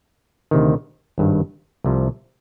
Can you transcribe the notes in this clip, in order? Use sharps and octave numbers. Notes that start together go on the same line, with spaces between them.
D2 C3 D#3
G#1 G2 D#3
C2 C3 F3